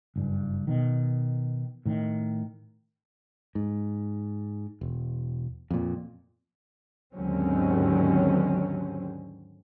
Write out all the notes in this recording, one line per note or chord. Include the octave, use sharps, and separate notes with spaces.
F#1 G2
B2 D#3
A2 D#3
G#2
E1
F2 A#2
D#2 G#2 D3 F#3 C4 C#4